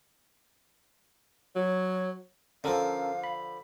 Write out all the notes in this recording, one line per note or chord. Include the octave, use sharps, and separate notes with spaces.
F#3 C#5
D3 F3 C#4 A4 A#4 F5
B5